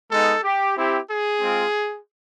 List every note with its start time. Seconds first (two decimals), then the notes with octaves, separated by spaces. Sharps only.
0.11 G#3 B3 D#4 A4
0.43 G4
0.76 C4 E4 G4
1.09 G#4
1.41 G#3 C4 F4